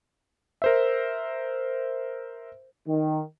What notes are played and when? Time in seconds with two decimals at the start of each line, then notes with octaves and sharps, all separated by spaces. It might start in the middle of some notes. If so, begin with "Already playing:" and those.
0.62 A#4 C5 E5
2.88 D#3